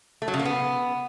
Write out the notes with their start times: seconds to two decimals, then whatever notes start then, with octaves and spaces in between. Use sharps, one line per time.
0.22 A3
0.28 F#3
0.34 C#3
0.39 A#3
0.45 B3